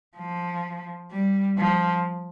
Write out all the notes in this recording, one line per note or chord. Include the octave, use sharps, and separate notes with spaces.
F3
G3
F3